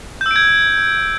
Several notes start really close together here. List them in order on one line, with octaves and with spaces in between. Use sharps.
G6 E6 D7 G#6